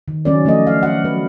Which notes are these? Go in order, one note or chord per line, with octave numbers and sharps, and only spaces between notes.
D#3
D#3 F#3 C#4 A#4 D5
F3 A3 D4 A4 D#5
F5
F#5
F#3 B4